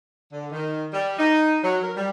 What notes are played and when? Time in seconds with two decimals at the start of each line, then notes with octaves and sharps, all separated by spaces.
0.32 D3
0.52 D#3
0.93 G3
1.19 D#4
1.63 F#3
1.83 A#4
1.97 G3